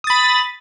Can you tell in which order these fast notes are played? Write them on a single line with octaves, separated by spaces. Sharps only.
D#6 A6 B5